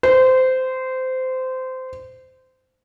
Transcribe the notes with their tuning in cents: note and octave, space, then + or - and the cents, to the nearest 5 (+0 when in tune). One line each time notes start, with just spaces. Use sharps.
C5 -20